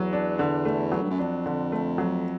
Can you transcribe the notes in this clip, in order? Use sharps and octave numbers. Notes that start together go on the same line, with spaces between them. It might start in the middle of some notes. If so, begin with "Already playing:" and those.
Already playing: E2 F#3
D4
D3
A3
F#3
G2
F#2
F2 D4
D3
A3
F#3